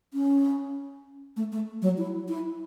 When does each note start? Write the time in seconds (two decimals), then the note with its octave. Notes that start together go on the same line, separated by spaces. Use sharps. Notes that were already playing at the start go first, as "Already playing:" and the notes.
0.14 C#4
1.37 A3
1.52 A3
1.82 F#3
1.98 E4
2.28 E4